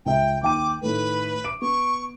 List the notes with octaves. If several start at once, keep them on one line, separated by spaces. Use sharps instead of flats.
C#2 E5 G5
D#2 G5 D6 D#7
A2 D#3 A3 B4
D6 D7
B3 C#6